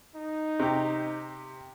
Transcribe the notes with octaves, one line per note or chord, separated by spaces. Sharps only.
D#4
C3 G4